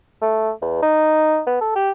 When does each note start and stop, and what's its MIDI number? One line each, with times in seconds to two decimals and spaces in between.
0.22 0.52 57
0.62 0.79 40
0.83 1.42 63
1.47 1.58 59
1.61 1.73 69
1.76 1.91 67